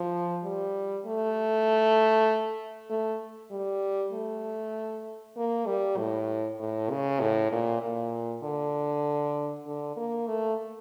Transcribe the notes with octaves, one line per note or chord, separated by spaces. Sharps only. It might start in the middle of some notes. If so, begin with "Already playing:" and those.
Already playing: F3
G3
A3
A3
G3
A3
A#3
G3
A2
A2
C#3
A2
A#2
A#2
D3
D3
A#3
A3